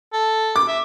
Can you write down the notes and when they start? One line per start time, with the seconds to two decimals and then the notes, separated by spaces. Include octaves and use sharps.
0.13 A4
0.56 D6
0.68 E5